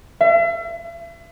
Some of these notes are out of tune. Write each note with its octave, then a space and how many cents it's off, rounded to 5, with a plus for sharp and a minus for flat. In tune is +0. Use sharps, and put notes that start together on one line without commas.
E5 +40